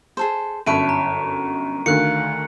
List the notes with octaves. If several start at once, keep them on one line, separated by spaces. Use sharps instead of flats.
G#4 A4 C5
G1 F#2 E4 A4 C#5 C#6 D7 D#7
A#5
D2 D3 D#3 F5 F#6 C#7